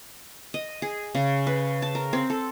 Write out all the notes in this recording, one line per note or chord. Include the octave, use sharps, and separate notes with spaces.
D#5
G#4
C#3
B4
A5
A#4
C4
A4